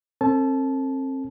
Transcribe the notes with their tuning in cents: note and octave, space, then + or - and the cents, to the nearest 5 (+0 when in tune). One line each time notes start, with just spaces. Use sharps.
C4 +35 A4 +40 A5 -20